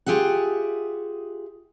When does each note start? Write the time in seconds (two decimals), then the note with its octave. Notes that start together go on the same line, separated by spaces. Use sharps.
0.06 F4 G4 G#4 E5 F#5